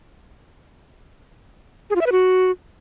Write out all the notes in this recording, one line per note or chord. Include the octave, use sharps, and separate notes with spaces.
G#4
F4
E5
B4
F#4